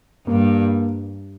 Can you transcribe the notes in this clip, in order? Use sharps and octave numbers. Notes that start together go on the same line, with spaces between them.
G2 A#3